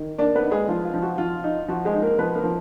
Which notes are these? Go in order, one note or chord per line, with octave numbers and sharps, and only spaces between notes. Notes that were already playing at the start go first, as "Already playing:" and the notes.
Already playing: D#3
A#3 D4 D5
B3 B4
D#4
G#3 G#4
F3 F4
F4
F3
F#4
F3 F4
D#4
F3 F#4
G#3 G#4
D#4
A#3 A#4
F3 B3 B4
A#3 A#4
F3